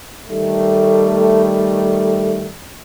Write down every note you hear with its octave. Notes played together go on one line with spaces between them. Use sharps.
D#3 G3 A3